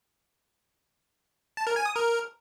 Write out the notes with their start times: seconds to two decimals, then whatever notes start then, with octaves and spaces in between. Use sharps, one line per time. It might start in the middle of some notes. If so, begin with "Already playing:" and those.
1.57 A5
1.67 A#4
1.76 G#5
1.86 D#6
1.95 A#4